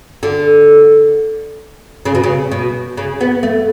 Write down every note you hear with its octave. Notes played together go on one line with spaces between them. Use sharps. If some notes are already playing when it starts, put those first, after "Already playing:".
D3
C#3
B2
C#3
B2
C#3
B3
A3